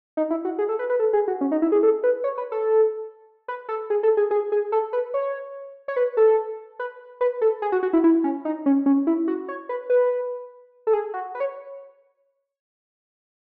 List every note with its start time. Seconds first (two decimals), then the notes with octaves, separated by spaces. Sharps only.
0.17 D#4
0.31 E4
0.45 F#4
0.58 G#4
0.69 A4
0.79 B4
0.90 B4
0.99 A4
1.13 G#4
1.28 F#4
1.41 C#4
1.52 D#4
1.62 E4
1.72 G#4
1.83 A4
2.03 B4
2.24 C#5
2.38 B4
2.52 A4
3.48 B4
3.69 A4
3.90 G#4
4.03 A4
4.17 G#4
4.31 G#4
4.52 G#4
4.72 A4
4.93 B4
5.14 C#5
5.88 C#5
5.96 B4
6.17 A4
6.79 B4
7.21 B4
7.41 A4
7.62 G#4
7.72 F#4
7.83 F#4
7.93 E4
8.04 E4
8.24 C#4
8.45 D#4
8.66 C#4
8.86 C#4
9.07 E4
9.28 F#4
9.48 C#5
9.69 B4
9.90 B4
10.87 A4
10.93 G#4
11.14 F#4
11.35 B4
11.40 C#5